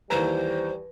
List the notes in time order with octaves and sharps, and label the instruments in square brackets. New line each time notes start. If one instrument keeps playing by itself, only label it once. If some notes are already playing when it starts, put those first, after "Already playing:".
[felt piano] D#2 E3 A#5 [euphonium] G3 [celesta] B4 [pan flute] C5